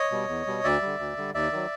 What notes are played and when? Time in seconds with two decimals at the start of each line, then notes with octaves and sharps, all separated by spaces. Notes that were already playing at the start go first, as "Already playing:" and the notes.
Already playing: C#5 D#5
0.11 B2 G3
0.29 E2
0.47 B2 G3
0.64 D2 D5 E5
0.82 D3 G3
0.99 D2
1.17 D3 G3
1.34 D#2 D5 E5
1.52 D#3 F#3